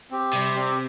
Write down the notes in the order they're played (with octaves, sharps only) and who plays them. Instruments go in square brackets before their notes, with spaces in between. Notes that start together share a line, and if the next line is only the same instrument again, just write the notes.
[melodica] C4 G4
[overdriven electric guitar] C3 [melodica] G3
[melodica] C4 G4